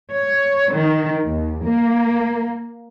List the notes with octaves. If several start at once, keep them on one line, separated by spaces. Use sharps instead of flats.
C#5
D#3
D#2
A#3